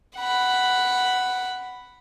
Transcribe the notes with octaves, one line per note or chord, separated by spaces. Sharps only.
F#5 B5